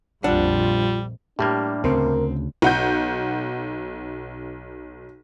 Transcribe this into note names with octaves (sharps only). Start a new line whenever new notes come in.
A#1 F2 G3 D4 F4 F#5
A2 G3 A#3 D4 G4
D2 C#3 C4 A#4
B1 F#5 G6